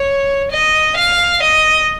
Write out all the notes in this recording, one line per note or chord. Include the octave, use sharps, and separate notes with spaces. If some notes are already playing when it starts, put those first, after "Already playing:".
Already playing: C#5
D#5
F5
D#5